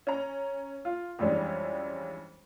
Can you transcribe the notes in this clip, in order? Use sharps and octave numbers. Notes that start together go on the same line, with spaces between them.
C#4 A#5
F4
F2 E3 G3 G#3 C#4 D4